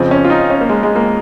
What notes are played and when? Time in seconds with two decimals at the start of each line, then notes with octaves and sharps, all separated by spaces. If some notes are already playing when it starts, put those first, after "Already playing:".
Already playing: F2 C#3 F3 C4
0.11 C#4
0.25 F4
0.30 D#4
0.50 C#4
0.61 A#3
0.69 G#3
0.83 G#3
0.96 A#3